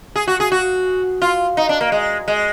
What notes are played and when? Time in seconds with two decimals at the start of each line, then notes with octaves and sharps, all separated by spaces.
0.16 G#4
0.28 F#4
0.40 G#4
0.52 F#4
1.22 F4
1.57 D#4
1.69 D4
1.81 A#3
1.92 G#3
2.28 G#3